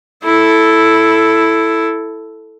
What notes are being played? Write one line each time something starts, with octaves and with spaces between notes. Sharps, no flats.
E4 A4